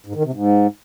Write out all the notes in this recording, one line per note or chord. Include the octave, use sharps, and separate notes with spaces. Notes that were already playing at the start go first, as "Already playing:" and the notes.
G#2
D#3
C3
G#2